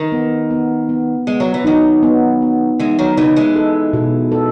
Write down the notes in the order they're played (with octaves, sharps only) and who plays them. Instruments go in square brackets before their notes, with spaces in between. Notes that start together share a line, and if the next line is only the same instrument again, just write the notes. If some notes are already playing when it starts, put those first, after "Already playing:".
Already playing: [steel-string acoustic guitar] D#3
[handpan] B3
B3
B3
[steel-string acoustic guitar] G#3 [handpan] B3
[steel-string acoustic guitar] F#3
E3
[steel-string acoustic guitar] D#3 F#3 [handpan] D#4
[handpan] B3
B3
[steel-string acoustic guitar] E3 G#3 [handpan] D#4
[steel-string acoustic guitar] D#3 F#3
[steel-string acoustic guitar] C#3 E3 [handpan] D#4
[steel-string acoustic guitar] E3 G#3
[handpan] A4
B2
A4